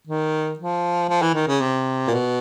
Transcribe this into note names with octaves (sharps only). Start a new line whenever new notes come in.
D#3
F3
F3
E3
D#3
C#3
C3
A#2
B2